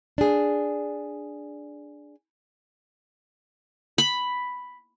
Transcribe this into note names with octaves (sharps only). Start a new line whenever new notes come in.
D4 G#4
B5